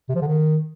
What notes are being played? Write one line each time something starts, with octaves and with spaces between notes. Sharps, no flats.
C3
F3
D3
D#3